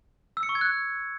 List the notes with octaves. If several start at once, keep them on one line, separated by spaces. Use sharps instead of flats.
E6
C#7
C#6
G#6
F#6